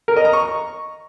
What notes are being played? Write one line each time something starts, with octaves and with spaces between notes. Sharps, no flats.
A#4
D#5
A#5
C#6